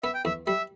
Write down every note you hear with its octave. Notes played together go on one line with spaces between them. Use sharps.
B3 E5
G5
E2 E5
G3 E5